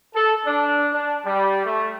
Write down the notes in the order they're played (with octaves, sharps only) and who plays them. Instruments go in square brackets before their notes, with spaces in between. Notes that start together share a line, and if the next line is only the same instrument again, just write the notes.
[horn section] A4
D4
D4
G3
A3